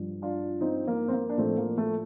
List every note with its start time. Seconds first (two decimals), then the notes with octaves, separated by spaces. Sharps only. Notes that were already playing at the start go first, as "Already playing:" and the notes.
Already playing: G2 F3
0.22 D4 F4
0.61 C4 D#4
0.87 A#3
1.08 C4
1.13 A#3
1.29 D4
1.38 A2 F3 A3 C4
1.58 A#3
1.78 A3